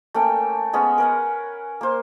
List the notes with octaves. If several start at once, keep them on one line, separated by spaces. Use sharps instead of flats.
A3 A#3 C#4 G5
G#3 B3 C#4
A#4 B4 F#5
A#3 C5